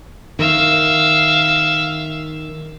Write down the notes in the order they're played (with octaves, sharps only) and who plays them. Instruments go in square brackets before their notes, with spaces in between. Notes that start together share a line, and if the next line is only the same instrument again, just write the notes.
[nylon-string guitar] D#3 [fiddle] E5 F5